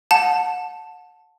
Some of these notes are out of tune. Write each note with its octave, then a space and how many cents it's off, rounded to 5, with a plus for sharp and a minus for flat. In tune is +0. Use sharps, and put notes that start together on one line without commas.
F#5 -30 A5 +0